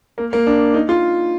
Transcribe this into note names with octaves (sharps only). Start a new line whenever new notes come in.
A#3
A#3
D4
D#4
F4